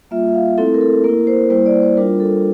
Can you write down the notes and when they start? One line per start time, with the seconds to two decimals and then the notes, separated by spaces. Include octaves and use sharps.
0.11 G3 A#3 F4 E5
0.28 E5
0.34 F5
0.58 A3 C4 E4 A4
0.74 A#4
0.81 A4
1.04 A#3 E4 A#4
1.27 C5
1.50 G3 A#3 E4 C5
1.66 D5
1.82 C5
1.97 G3 D4 F4 A#4
2.20 A4